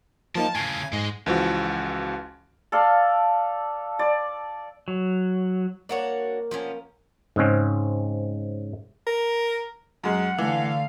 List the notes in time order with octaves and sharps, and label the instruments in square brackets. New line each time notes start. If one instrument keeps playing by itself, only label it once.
[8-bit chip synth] F3 A#3 D#4 [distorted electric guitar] A5
[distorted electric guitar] A2 C#3 [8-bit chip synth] G#5
[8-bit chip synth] G#2 [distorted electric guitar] G#3
[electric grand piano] C#2 E3 F3 F#4
[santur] A4 D5 F5
D5
[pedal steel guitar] F#3
[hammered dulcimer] A#3 [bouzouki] D4 F#4 C#5
[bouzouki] F3 B3 C#4
[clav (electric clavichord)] G#2 C#3 G#3 C4 C#4
[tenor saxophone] A#4
[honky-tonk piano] F#2 G#3 [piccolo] F#5
[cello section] D3 A3 F5 [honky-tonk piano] E3